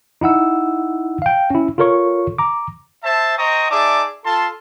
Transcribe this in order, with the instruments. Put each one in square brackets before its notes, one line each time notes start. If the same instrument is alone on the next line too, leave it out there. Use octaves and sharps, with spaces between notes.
[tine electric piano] D#4 E4 F#5 E6
F5 G5
C#4 E4
F4 A4 A#4 C#5 C#6
A#5 D6
[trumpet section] C5 E5 A5
C5 D#5 G5 A#5 C#6 D#6
D#4 G#4 D5 E5 A5 D6
F4 A4 A5 C6